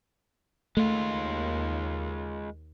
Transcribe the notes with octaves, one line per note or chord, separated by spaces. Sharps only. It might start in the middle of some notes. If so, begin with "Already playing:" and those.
D#2 G#3 A3 F4